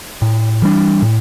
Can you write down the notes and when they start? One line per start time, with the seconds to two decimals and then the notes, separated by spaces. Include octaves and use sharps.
0.22 A2
0.62 E3 G3 D4
1.02 A2